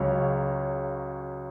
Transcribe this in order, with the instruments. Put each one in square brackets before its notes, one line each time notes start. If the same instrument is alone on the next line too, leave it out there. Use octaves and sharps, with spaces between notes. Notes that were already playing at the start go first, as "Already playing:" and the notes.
Already playing: [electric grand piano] C#2 C#3 F#3 C#5